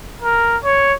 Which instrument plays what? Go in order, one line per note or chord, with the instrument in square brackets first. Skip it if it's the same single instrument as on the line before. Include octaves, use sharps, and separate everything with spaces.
[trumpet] A#4
C#5